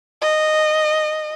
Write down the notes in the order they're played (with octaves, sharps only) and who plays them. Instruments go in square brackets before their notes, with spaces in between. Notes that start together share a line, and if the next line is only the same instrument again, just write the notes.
[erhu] D#5